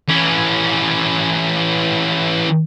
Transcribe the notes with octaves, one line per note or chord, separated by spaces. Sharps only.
E3 C#4